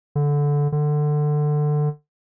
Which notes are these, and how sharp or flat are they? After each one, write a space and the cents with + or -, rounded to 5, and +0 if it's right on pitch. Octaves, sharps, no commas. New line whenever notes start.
D3 -15
D3 +20